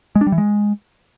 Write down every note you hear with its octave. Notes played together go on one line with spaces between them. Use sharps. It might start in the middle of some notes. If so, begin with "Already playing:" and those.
G#3
D4
G3
E3
G#3